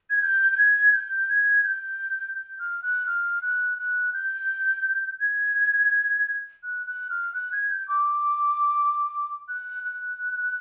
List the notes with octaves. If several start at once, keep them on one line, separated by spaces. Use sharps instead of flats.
G#6
G6
G6
G#6
G6
G#6
G6
G6
F6
F#6
F6
F#6
F#6
G6
G#6
F#6
F#6
F6
F#6
G#6
G6
D6
F#6
F#6